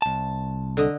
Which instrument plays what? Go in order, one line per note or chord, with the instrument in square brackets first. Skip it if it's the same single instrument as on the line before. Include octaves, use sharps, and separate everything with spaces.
[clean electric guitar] C2 A5
[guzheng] D3 D#5